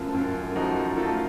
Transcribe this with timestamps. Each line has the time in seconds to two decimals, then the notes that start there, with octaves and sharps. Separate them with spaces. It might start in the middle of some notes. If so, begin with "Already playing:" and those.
Already playing: F#2 F3 A3 F4 A4 A#4
0.14 F#2
0.56 F3 D#4 F#4
0.97 A3 F4 A4